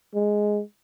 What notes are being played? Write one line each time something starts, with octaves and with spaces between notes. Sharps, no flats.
G#3